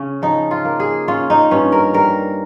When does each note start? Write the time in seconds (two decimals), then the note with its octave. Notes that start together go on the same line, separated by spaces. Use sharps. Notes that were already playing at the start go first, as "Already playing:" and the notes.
Already playing: C#3 C#4
0.22 F3 D#4
0.51 F4
0.65 A#3
0.80 G#4
1.08 C#4 F4
1.30 D#4
1.51 G2 C#4
1.72 A#4
1.94 G3 A#4